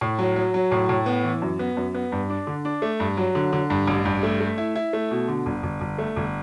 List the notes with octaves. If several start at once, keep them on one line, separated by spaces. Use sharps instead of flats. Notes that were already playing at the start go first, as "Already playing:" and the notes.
A2
F#3
F#3
F#3
A2
A2
B3
E3
F#2
B3
F#2
B3
G2
D4
D3
D4
A3
G2
F#3
D3
D3
G2
A1
G2
A3
A3
E4
E4
A3
B2
D3
G1
G1
G1
A3
G1